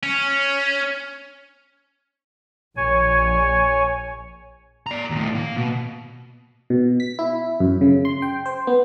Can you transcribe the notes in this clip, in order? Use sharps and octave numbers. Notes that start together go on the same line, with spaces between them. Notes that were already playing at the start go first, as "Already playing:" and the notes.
C#4
A#1 C#5 G#5
D5 A#5
D#2 A2
A#3
B2
B2
B6
E4
F#2
C#3
C6
G5
C5
B3